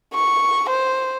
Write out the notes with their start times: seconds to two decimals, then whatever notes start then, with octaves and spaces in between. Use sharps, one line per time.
0.14 C#6
0.70 C5